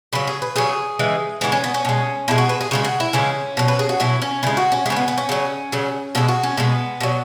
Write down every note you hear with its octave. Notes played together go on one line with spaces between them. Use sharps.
C#3 F#3 B4
G#4
B4
C#3 F#3 G#4
C#3 E3 G#3
C#3 E3 G#3 B3
C#4
B3
C#4
B2 G#3
B2 G#3 E4
F#4
B4
G#4
C#3 E3 G#3 F#4
F#4
E4
C#3 E3 G#3 C#4
B2 F#3
B4
G#4
F#4
B2 F#3 E4
C#4
C#3 G#3 E4
F#4
C#4
C#3 G#3 C#4 E4
B3
B3
C#4
C#3 F#3
C#3 F#3
B2 G#3 E4
F#4
C#4
B2 G#3 B3
B2 F#3